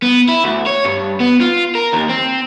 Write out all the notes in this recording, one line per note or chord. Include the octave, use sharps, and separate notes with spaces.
B3
E4
D2
C#5
G2
B3
F4
A#4
D#2
C4